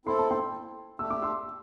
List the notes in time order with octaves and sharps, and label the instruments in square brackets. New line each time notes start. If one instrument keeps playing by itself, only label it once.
[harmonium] C4 E4 A4 [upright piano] C6
[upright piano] A5
G5 C6
[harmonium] A3 D4 G4 [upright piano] E6
[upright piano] D6
C6 E6